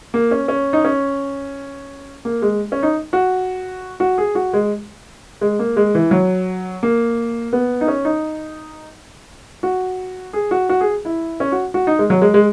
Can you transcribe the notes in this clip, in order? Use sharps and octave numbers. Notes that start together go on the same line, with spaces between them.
A#3
C#4
C#4
D#4
C#4
A#3
G#3
C#4
D#4
F#4
F#4
G#4
F#4
G#3
G#3
A#3
G#3
E3
F#3
A#3
B3
D#4
C#4
D#4
F#4
G#4
F#4
F#4
G#4
E4
C#4
F#4
F#4
D#4
G#3
F#3
G#3
G#3